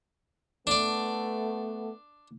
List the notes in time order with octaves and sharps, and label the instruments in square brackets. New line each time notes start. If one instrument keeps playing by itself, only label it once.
[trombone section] A3 B3 [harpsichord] D4 D5